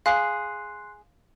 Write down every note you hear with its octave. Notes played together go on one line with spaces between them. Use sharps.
G#4 F5 C6 F#6 C7